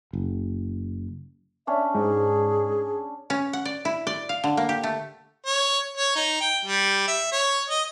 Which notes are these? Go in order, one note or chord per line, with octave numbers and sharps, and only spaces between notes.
F#1
C#4 D4 E5
G#2 G#4
C#4
F#5
D5
E4
D5
F5
D3
A#3
G4
A3
C#5
C#5
D#4
G5
G3
E5
C#5
D#5